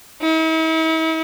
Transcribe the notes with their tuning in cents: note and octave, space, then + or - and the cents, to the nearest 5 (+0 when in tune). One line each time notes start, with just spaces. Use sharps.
E4 -45